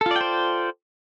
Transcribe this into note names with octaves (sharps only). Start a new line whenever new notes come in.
F4 A4 C5 D5 G5